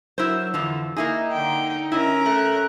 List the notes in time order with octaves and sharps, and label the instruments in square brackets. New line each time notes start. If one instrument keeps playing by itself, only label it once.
[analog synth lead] F#3 [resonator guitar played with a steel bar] E4 A#4 C5
[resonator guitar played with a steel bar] F2 E3 F3 [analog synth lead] D3
[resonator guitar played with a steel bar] A#3 E4 G#4 [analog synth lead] D#4
[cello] D3 G5
[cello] C#4 A#4 [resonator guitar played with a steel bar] E4 D#5
[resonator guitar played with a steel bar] A3 [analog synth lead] F#6